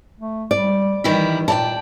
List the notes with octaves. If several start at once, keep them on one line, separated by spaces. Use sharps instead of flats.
A3
G3 D5
D#3 E3 G3 E4
A#2 E4 D5 G5 A5